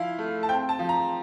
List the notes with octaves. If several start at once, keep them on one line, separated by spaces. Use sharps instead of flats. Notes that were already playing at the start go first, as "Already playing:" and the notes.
Already playing: F3 E4 F5
A3
A5
C4 G5
A5
F3
A#5